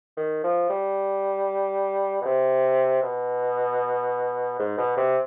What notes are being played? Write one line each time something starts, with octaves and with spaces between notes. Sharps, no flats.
D#3
F3
G3
B2
C3
B2
G#2
B2
C3